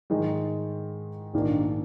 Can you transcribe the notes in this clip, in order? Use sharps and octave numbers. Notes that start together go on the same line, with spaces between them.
G#2 D#3 G#3 D#4
A#1 G#2 D#3 A#3 D4